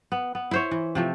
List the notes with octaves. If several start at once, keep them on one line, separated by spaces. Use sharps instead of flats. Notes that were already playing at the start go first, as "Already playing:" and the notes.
B3
B3
E4 C5 C#5
E3
C3 F3 A3